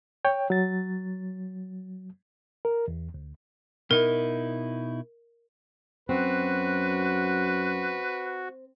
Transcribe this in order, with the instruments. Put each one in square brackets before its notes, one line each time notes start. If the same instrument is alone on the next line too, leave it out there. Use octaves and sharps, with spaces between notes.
[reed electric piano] C#5 G5
F#3 A6
A#4
E2
D2
[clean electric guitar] B2 D#4 E4 [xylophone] A#4
[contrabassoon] F#2 [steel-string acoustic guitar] C4 [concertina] F#4 [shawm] B4